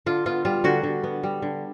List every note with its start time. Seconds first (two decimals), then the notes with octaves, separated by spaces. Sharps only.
0.06 D3 F4
0.26 B3 F4
0.45 G3 F4
0.64 D3 F#4
0.83 D3
1.04 B3
1.23 G3
1.42 D3